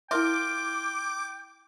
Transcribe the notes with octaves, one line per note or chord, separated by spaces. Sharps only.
E4 F4 A#4 E5 G5 D6